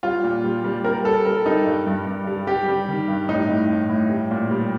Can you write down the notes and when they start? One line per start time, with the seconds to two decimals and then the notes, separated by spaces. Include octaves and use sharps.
0.03 G3 F4
0.24 A#2
0.44 G3
0.64 G3
0.84 G3 A#4
1.05 G3 A4
1.25 G3 A#4
1.46 G3 D#4
1.66 G2
1.87 G2
2.07 G2
2.27 G3
2.47 G3 G4
2.68 G3
2.88 D#3
3.08 G2
3.29 A2 D#4
3.49 A2
3.70 A2
3.90 A2
4.10 G3
4.31 A#2
4.51 G3